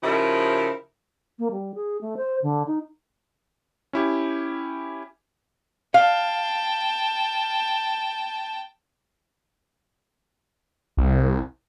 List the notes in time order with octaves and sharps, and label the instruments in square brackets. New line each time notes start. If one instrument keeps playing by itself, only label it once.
[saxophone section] C#3 F3 D#4 E4 G4 A#4
[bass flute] A#3
G3
G#4
A3
C5
D3
D#4
[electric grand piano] C#4 E4 G4
[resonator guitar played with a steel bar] F5 [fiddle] G5 A5
[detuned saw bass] C2